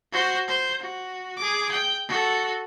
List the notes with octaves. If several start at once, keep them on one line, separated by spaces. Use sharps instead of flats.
F#4 C5
C5
F#4
G#4 D6
G5
F#4 A4